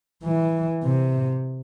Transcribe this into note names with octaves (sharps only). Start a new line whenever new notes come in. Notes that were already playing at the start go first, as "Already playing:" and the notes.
E3
C3